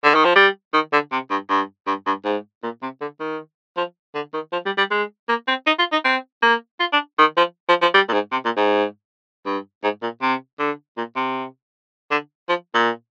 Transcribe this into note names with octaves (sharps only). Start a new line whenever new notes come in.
D3
D#3
F3
G3
D#3
D3
C3
G2
G2
G2
G2
G#2
A#2
C3
D3
D#3
F3
D3
D#3
F3
G3
G3
G#3
A#3
C4
D#4
F4
D#4
C4
A#3
F4
D4
D#3
F3
F3
F3
G3
A#2
G#2
C3
A#2
G#2
G2
G#2
A#2
C3
D3
A#2
C3
D3
F3
A#2